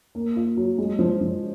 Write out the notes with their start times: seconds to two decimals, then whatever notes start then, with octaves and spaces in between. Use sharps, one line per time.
0.15 A#3
0.36 F4
0.57 F#3
0.78 G#3
0.99 F3
1.21 F3